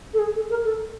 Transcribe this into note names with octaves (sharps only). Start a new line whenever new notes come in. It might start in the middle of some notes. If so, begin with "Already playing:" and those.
A4
G#4
A4
A#4
A4